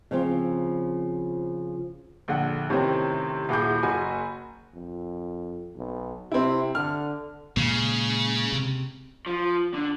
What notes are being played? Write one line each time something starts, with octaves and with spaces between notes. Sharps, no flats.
C#3 F3 C4
A#1 D3 F#5
A2 C3 D#3 C4 C#4
D#1 E4 F#4 G#4 D6 G6
F#1 F#4 G#5
F2
B1
C3 C4 E4
D3 F6
A#2 C#3 G#3
C3
F3
D3